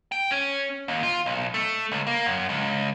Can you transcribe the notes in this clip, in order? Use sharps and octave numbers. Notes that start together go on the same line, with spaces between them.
G5
C#4
D#2
F4
B1
A3
C#2
A#3
F#2
C#2